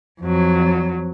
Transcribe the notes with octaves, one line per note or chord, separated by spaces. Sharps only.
F2 F#3